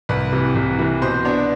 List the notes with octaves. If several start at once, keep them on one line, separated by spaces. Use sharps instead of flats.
C2 B4
C3 E3
C2
C3 E3
B2 C5
B3 D4